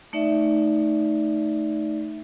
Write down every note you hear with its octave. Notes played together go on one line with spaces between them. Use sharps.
A3 D#4 D5 E5